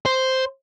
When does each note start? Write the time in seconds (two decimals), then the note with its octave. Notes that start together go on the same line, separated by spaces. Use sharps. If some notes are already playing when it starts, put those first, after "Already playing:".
0.06 C5